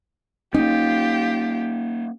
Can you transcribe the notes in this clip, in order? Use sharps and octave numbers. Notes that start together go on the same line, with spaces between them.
A#3 C#4 D#4 F4 G4